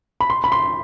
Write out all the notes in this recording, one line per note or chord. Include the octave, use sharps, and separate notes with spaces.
B5
C6
B5
C6